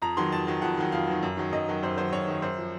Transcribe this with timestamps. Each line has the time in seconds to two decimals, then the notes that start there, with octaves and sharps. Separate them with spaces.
0.02 F2 A#5
0.17 D#3 F#3 C6
0.32 F2 A5
0.47 D#3 F#3
0.62 F2 F#5
0.77 D#3 F#3
0.92 F2 F5
1.07 D#3 F#3
1.23 F#2
1.37 D#3 F#3
1.52 F#2 D#5
1.68 D#3 F#3
1.83 F#2 C5
1.98 D#3 F#3 C5
2.12 F#2 C#5
2.27 D#3 F#3
2.42 F#2 C5
2.58 F3